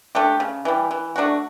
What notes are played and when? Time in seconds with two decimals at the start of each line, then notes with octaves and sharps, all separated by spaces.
0.15 A3 D4 G4
0.40 C#3
0.65 E3 G3
0.91 E3
1.16 A3 D4 F#4